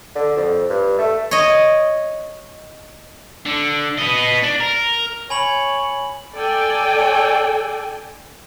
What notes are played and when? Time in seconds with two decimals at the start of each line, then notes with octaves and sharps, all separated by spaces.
0.15 D3
0.37 F2
0.70 G2
0.99 A3
1.31 C#5 D#5
3.45 D3
3.98 B3 D#5
4.43 D4
4.60 A#4
5.30 C#5 G#5 B5 F#7
6.33 A4 D5 G5 G#5